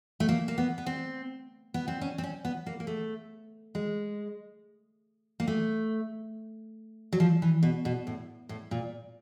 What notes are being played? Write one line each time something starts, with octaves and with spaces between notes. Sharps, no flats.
A3
A#3
A#3
B3
B3
C4
B3
C4
C#4
C4
C#4
B3
A#3
A#3
A3
G#3
A#3
A3
F#3
F3
E3
B2
B2
A2
A2
A#2